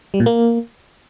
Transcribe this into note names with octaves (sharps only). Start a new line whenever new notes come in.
G3
A#2
A#3